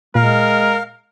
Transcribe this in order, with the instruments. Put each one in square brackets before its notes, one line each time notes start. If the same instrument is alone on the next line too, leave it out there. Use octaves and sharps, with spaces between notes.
[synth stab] A#2 [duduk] G#3 [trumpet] A#4 [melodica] F5